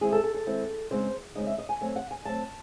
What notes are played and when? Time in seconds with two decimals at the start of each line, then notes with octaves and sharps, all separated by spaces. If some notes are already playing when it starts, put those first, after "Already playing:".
0.01 D#3 G#3 C4 E4 G#4
0.12 A4
0.24 A4
0.34 A4
0.46 D#3 G#3 C4 E4
0.90 C#3 G#3 C4 D#4 C5
1.35 C#3 G#3 C4 D#4 D#5
1.47 E5
1.58 D#5
1.69 G#5
1.81 F#3 A3 C4 G#5
1.96 F#5
2.11 G#5
2.25 F#3 A3 C4 A5